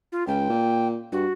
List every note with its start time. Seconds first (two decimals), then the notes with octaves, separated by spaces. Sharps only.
0.12 F4
0.27 C#2 G5
0.49 A#2
1.12 G2 F#4